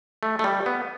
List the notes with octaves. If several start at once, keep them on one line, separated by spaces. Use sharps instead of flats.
A3
A3
G3
B3